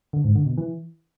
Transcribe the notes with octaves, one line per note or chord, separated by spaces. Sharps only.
D3
G#2
D3
B2
E3